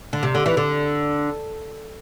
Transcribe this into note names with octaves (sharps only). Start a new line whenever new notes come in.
D3
C3
D3
E3
D3